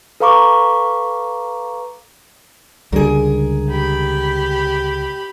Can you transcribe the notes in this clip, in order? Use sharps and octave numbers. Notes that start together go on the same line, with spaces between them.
A4 B4 F5 A#5 C#6 D6
C#2 D3 G3 G#4 A#4
G4 B5